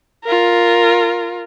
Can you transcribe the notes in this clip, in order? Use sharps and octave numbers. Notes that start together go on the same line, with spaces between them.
F4 A#4